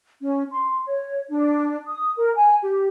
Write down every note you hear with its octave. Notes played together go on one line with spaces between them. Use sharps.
C#4
C6
C#5
D4
D#6
A#4
G#5
G4